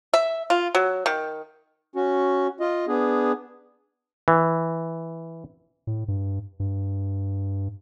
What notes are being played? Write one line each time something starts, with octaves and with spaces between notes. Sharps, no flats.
E5
F4
F#3
D#3
C#4 F#4
F4 D#5
B3 D4 G#4
E3
A2
G2
G2